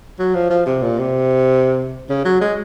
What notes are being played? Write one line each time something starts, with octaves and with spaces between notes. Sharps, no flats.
F#3
F3
F3
C3
A#2
C3
C#3
F#3
G#3